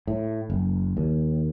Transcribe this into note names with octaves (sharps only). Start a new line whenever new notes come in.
A2
F#1
D#2